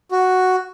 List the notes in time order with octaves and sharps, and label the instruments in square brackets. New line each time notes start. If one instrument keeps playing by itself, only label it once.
[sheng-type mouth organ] F#4